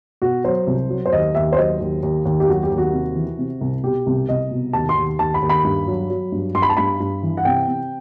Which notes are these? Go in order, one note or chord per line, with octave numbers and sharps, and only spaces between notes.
B2 F#4
F#3 C5
C2
F#3
C5
D#2 D#5
D#2 E5
C5
F#3 D#5
D#2
D#2
D#2
G4
F#3 F#4
G4
D#2
F#4
C3
E3
C3
C2
B2 G4
C2
C2 D#5
B2
D#2 A5
C6
D#2
D#2 A5
B5
D#2
B5
G2
F#3
F#3
G2
G2 C6
B5
A5
G2 B5
G2
E3
F#5
C3 G5
C3